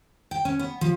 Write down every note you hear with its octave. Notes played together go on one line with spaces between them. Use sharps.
G5
C#4
B3
F3